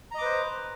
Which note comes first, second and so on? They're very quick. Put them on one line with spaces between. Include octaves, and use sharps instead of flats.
A#5 D#5 D6 B4 C5